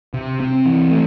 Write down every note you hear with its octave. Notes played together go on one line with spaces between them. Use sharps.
C3
C4
E3
A3